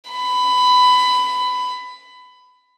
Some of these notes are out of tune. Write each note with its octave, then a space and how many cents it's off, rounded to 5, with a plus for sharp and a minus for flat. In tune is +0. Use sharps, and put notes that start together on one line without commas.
B5 +15